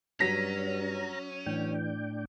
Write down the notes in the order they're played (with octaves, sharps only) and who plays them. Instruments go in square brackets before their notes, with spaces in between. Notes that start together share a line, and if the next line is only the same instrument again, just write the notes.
[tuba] G2 [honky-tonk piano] F#3 A#6 B6 [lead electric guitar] C#4 [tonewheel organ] A#5
[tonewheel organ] A2 D4 G5 [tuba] E3